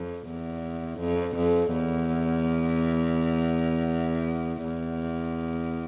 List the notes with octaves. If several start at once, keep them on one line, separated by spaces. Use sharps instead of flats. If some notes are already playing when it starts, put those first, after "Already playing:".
Already playing: F2
E2
F2
F2
E2
E2